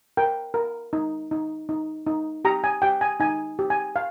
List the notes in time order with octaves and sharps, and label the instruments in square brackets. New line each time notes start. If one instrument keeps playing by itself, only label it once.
[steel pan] A#4 G5
A#4
D#4
D#4
D#4
D#4
G4 A#5
G#5
G4 G5
G#5
D#4 G#5
G4
G#5
F5